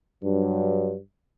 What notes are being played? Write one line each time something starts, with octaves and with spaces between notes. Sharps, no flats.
G2 F#3